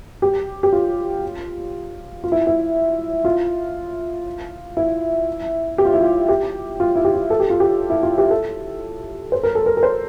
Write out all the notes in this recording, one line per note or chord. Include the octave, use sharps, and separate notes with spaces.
G4
G4
F4
F4
E4
E4
F4
E4
G4
F4
E4
F4
G4
F4
E4
G4
F4
A4
G4
F4
G4
E4
F4
G4
A4
C5
A#4
A4
A#4
A#4
C5